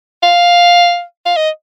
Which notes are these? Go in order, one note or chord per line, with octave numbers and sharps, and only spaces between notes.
F5
F5
D#5